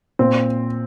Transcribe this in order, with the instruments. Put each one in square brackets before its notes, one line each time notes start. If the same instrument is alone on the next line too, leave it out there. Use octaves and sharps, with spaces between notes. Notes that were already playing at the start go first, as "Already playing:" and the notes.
[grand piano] A#2 C4